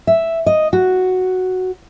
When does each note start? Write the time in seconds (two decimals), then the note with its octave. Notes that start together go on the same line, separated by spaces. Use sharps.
0.07 E5
0.46 D#5
0.73 F#4